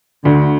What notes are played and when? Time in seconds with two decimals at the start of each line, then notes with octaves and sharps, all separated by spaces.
0.25 D2 D3